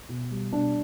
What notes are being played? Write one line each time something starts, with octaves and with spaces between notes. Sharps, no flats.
B2
G3
B2 D4